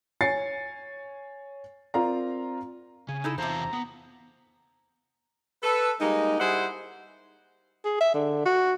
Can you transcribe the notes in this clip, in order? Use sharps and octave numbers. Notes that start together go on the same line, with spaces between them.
C#5 G#5 A6 C7 C#7
C4 F4 A#4 D5 F5 A#5
C#3 G#5
D#4 E4 A4
E2 C3 F4 C5 A5 A#5
B3
A4 B4
G3 G#3 A#3 D#4
G3 E4 G#4 C5 D#5 F#5
G#4
E5
D3
F#4